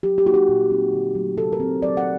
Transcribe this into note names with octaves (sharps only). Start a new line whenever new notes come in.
F#3 G4
G4
A#3 D#4 F#4 G4
A#2
F#3 C4 D#4
D3
F#3 A3
C3 A4
A#4
F#3 C4
F#3 D5
F#5